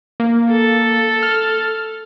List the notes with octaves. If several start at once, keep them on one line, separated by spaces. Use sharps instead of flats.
A#3
A4
F6